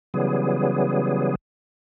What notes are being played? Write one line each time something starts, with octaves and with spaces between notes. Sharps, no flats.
C#3 E3 F#3 G3 B3 G#4